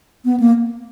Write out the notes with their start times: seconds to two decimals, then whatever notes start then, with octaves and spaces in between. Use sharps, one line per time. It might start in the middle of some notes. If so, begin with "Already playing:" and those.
0.25 B3
0.40 A#3